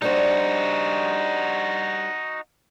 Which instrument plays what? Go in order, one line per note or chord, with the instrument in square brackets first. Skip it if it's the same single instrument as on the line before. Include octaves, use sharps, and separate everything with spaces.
[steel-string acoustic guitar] G3 D4 C5 [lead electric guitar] D#4 F#4